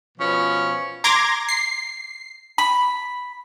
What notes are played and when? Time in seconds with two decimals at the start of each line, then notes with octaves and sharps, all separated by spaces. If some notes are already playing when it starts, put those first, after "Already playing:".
0.18 B2 F3 C#4
1.04 A#5 C6 D6 G#6 A#6
1.49 C7
2.58 B5